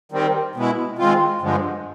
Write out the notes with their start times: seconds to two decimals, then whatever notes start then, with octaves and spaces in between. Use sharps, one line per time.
0.12 D#3 G3 C4
0.56 B2 G#3 B3 E4
0.98 D#3 G#3 C4 F4
1.41 G2 D3 F3 G#3